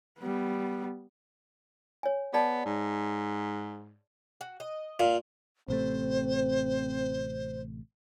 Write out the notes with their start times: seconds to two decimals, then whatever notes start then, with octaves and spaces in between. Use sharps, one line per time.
0.19 G3 B3
2.03 C#5 G#5
2.33 B3 G#4 D5 A5
2.66 G#2
4.41 F#4
4.60 D#5
5.00 A#2 F5
5.68 A1 C3 A3 C4 C5